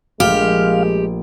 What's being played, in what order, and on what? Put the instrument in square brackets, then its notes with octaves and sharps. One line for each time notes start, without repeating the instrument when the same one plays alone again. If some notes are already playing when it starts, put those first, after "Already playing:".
[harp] A#1 A3 C5 [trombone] G#3 [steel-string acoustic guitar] G4 [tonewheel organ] F5